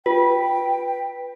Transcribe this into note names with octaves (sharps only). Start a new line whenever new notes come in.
F4 B4 G5